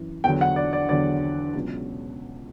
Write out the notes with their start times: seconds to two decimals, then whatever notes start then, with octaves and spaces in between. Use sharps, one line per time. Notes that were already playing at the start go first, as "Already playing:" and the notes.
Already playing: F#2 E3
0.24 E2 D3 F#3 G5
0.41 F#5
0.56 D5
0.73 D5
0.89 E2 D3 F#3 D5
1.54 C#2 B2 F#3